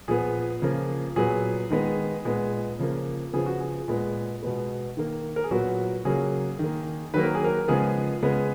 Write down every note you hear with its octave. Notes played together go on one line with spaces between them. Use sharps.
A#2 F3 B3 G#4
C#3 F3 A#3
A#2 F#3 B3 G#4
D#3 G#3 B3
A#2 G#3 B3
C#3 F3 A#3
C#3 F3 B3 G#4
F#4
G#4
A#2 G#3 B3
B2 G#3 B3
D#3 A#3
A#4
G#4
A#2 F#3 B3 F#4
C#3 F#3 A#3 G#4
D#3 A#3
D#3 F#3 A#3 B4
A#4
G#4
A#4
C#3 F3 G#3 B3 G#4
C#3 G#3 B3